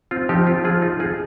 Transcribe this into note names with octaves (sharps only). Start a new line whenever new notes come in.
C4 F4
F3 D#4 G4
C4 F4
F3 F4 G#4
D#4 F4
D#4 F4 G#4